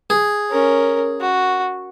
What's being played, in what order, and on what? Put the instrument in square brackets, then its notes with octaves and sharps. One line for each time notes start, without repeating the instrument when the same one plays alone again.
[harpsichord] G#4
[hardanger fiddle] C#4 A#4
F#4